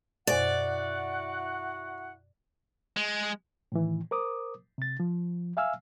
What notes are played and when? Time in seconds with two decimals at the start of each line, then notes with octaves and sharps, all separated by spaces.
0.27 F#2 B2 E4 F#4 C5 D5 F#5
2.96 G#3
3.72 A2 D#3 E3
4.11 A#4 C5 D6 D#6
4.78 C3 A6
5.00 F3
5.57 E5 F5 G#5 E6 F6